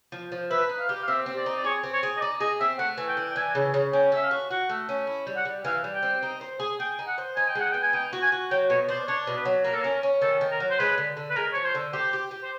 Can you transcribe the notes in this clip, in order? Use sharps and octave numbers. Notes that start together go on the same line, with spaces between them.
F3
F3
B4 E5
D#4
F5
G4
F5
C4 E5
C4
D5
D#4
D5
G#4 C#5
C4
C#5
G#4
D#5
D#4 D5
G#4 D#5
C4 E5
A3 F#5
E3
G5
D4
G5
E3 G#5
C#3
C#3
C#4 G5
A4 E5
F5
F#4
F#4 F#5
A3
C#4
E4
G3
F#5
G3
E3 F5
G3
G5
C4
D#4
C5
G#4
G#4 G5
D#4
F#5
C5
D#4 G#5
G5
G#3 F#5
B3 G5
G#5
D#4 G5
F#4
G#5
F#4
F#3 G5
B2 C#5
D4 C5
D4 C#5
B2
B4
F#3
A#3 A#4
A4
C#4 A#4
C#4
D#3 A4
D#3
A#4
F#3
C5
G#3 B4
D3
D3
B4
G#3 A#4
F3 C#5
C5
D3
G4 C5
G4
G4
C5